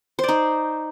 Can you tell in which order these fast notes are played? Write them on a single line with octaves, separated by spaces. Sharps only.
C5 D5 D#4